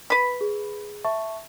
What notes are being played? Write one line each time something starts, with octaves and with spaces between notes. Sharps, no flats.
B4 B5
G#4
E5 A5 C#6